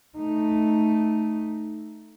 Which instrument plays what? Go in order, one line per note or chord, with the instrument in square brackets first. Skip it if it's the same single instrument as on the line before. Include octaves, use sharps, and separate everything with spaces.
[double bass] A3 D#4